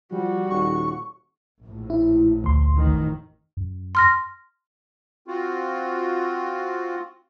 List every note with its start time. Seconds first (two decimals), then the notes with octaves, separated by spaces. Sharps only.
0.12 F3 G3 F#4
0.49 D#1 C#6
1.60 A#1 A2
1.90 E4
2.44 D2 C6
2.75 A1 F2 D#3
3.57 F#2
3.95 C6 F6 A#6
5.27 C4 F4 F#4